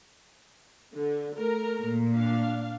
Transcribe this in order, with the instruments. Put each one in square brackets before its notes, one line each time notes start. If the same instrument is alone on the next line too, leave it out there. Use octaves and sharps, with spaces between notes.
[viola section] D3
A3 A#4 A#5
[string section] A#2
[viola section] D4 F5